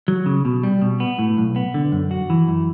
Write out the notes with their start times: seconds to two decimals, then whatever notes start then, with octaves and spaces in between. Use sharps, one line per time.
0.08 F#3
0.26 C#3
0.45 B2
0.63 G3
0.82 B2
1.00 B3
1.19 A2
1.37 B1
1.56 B3
1.74 D3
1.92 F#2
2.11 F#4
2.30 E3
2.48 F#2